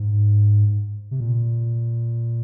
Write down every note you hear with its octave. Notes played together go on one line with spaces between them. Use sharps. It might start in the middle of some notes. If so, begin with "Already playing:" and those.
Already playing: G#2
C3
A#2